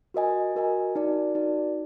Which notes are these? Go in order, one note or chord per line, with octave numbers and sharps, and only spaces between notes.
F#4 A#4 D#5 G#5
F#4 A#4 D#5 G#5
D#4 F#4 A#4 D5
D#4 F#4 A#4 D5